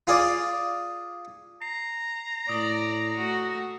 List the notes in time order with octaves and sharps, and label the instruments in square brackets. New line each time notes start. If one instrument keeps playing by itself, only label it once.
[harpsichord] F4 G#4 D5
[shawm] A#5 [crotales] C7
[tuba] A2 [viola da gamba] D5 [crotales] D#6 A#6
[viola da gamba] A3 F#4